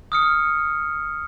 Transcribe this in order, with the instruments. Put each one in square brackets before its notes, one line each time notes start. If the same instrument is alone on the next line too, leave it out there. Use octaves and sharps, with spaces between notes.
[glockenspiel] D#6 F6 C#7